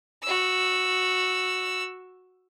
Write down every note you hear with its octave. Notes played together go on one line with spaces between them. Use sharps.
F#4 E6